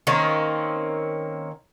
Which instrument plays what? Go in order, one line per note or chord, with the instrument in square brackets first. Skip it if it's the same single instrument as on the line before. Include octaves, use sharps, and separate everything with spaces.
[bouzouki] D#3 A#3 C4 C#4